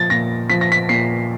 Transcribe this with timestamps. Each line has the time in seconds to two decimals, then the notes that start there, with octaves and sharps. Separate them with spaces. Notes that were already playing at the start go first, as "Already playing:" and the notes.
Already playing: A#2 F3 A6
0.10 A#2 A#6
0.50 F3 B6
0.61 A#6
0.72 B6
0.89 A#2 C7